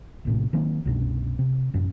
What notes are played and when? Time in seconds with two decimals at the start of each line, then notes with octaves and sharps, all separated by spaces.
0.25 A#1 A2 C3
0.53 D#3 F#3 A#3 C4
0.85 C2 F#2 B2 D4
1.39 C3
1.74 A1 F#2